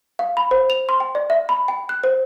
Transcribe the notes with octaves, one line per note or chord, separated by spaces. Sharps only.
F5
B5
C5
F7
C6
G5
D5
E5
B5
G5
F#6
C5